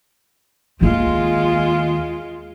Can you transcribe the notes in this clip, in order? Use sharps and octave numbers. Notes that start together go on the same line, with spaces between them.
D#2 G#3 A#3 F4